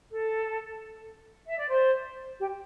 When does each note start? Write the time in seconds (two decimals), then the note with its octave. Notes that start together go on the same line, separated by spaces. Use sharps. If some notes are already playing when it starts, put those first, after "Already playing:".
0.10 A4
1.47 E5
1.58 D5
1.69 C5
2.40 G4